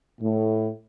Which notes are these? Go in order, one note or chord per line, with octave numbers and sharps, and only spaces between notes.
A2